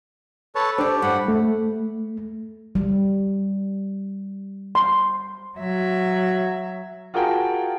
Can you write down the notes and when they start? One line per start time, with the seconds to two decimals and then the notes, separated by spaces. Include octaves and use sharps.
0.55 A4 B4 C#5 A5
0.78 D4 G4 C5 D5
1.02 G2 F#5 B5
1.28 A3
2.75 G3
4.75 C6
5.58 F#3 E5
7.14 F4 F#4 G#4 A#4 G5 A5